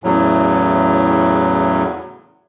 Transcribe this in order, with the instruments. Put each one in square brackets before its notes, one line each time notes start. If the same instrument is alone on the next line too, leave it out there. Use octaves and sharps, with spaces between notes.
[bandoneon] E2 A2 C#3 F#3